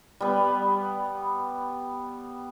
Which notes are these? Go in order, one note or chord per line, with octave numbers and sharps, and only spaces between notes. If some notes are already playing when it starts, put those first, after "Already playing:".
G3 B3